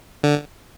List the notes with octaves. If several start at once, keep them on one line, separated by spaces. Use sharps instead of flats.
D3